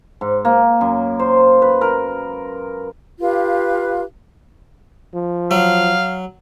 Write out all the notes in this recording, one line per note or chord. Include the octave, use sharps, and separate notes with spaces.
G#2
A#3
F#2
C5
B4
A#4
F4 G4 B4 F5
F3
F#3 F5